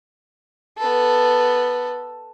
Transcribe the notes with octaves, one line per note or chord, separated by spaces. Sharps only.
B3 A4